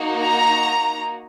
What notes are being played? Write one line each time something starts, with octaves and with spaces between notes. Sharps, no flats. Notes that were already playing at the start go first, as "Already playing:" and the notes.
Already playing: A#3 D#4 F#4
A#5